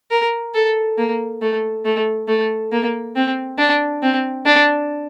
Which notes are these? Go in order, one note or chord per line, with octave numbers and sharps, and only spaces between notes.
A#4
A4
A#3
A3
A3
A3
A#3
C4
D4
C4
D4